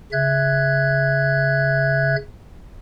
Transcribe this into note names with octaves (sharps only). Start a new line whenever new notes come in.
C#3 E5 F#6 G#6